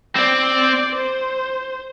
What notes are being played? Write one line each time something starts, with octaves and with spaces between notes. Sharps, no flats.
C4 D5
C5